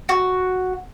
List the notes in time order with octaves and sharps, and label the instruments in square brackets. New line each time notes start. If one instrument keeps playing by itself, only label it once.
[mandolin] F#4